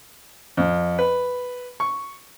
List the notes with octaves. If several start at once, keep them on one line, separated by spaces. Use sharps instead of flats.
F2
B4
C#6